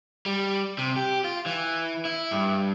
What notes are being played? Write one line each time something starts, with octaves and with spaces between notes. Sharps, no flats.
G3
C3
G4
F4
E3
E4
G2